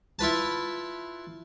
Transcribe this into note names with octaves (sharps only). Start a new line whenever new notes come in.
E4 F4 B4 A5